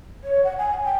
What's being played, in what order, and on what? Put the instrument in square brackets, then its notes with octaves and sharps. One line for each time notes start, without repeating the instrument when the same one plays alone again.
[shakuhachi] C#5
F#5
G#5
G5